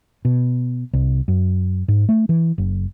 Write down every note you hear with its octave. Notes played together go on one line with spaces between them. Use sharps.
B2
C2
F#2
G#2
A3
E3
F#1